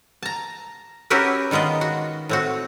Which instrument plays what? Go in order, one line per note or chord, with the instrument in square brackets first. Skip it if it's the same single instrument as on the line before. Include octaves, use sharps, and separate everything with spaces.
[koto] A5 A#5
C#4 E4 F#4 G4 A#4 B4
D#3 G#3 B3 F4 D#5
F#4
A2 C4 F#4